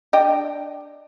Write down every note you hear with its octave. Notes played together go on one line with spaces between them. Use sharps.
D4 D#5 G5